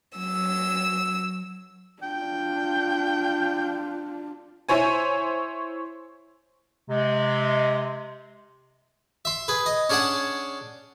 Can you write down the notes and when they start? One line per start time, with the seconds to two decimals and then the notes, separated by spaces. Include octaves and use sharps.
0.17 F#3 E6
2.02 D4 F4 G5
4.69 E4 C5 C#5 G#5
6.89 C3 G#3
9.25 E5 C6
9.48 G#4 B4
9.66 D#5
9.90 C#4 D4 G#4 D5 F#5 A5